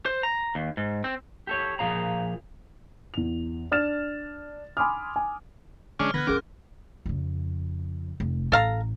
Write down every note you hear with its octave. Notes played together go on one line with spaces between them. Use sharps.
C5
A#5
D#2
G#2
C4
G4 A4 C#5
A#2 F3 G#4 F5 A#5
E2 F7
D4 F6 A6 E7
G#5 B5 C6 D6 D#6 F6
G#5
D3 G#3 C#4 D4 F6
D3 B3 F#6 G#6 A#6
D1 B3 C#4 G#4 A#4 D6
F2 C#3
F1
A1 A4 F5 A#5